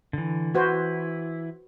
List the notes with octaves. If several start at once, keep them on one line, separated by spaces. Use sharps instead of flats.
D3 E3
E3 E4 F#4 B4 C5